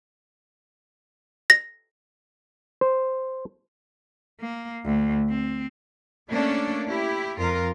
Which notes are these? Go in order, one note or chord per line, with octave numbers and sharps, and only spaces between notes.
A#6
C5
A#3
D2
C4
A3 A#3 C#4 D4
E4 G4
F2 F4 A#4